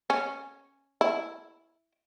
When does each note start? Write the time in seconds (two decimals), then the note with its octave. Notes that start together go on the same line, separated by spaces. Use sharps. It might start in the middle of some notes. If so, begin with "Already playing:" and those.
0.10 C#4
1.01 E4